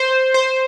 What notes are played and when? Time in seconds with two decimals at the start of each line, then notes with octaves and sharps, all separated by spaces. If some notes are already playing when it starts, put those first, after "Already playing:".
Already playing: C5
0.34 C5